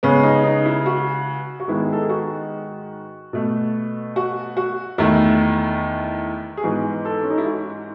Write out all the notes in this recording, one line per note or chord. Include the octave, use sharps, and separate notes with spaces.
C#3 G#3 B3 C#4
D#4
D#4
E4
F#4
F#4
G#2 D#3 G#3 B3 E4
A4
G#4
F#4
B2 A3
F#4
F#4
E2 D#3 A3 E4
G#4
G#2 E3 B3 F#4
A4
C#4
D#4
E4
F#4